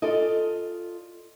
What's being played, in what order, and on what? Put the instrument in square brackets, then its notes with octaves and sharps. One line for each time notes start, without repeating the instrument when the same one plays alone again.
[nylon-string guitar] F4 A4 D5 D#5